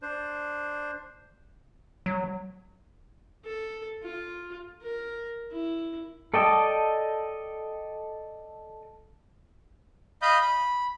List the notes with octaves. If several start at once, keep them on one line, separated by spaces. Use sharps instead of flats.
D4 C5
F#3
A4
F4
A#4
E4
A4 D5 D#5 G5 A5
D#5 F5 B5 D#6 G6
B5